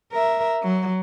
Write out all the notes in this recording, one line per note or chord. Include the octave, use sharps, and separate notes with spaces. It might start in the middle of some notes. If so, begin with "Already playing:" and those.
A#4 E5
F#3